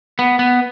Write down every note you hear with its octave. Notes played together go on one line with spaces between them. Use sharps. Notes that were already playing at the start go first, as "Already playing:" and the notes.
B3
B3